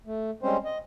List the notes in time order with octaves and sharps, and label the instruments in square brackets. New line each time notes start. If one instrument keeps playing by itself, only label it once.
[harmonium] A3
G3 G#3 C4 C#4 C5
D#5